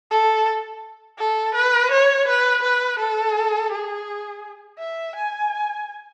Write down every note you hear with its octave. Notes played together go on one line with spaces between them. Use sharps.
A4
A4
B4
C#5
B4
B4
A4
G#4
E5
G#5